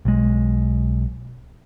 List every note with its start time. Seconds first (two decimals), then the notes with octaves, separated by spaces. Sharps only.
0.05 B1 G#3